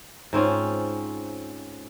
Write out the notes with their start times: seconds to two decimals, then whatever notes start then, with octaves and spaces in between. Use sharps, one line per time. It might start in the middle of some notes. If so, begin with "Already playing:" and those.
0.33 G#2 C4 C#4 F4